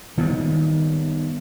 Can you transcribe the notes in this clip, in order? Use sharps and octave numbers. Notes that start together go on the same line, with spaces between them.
D#3 G3 B3